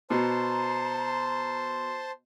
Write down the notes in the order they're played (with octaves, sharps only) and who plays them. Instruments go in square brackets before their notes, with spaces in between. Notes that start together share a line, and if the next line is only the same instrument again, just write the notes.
[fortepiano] B2 [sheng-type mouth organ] C5 A5 C6 [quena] A#5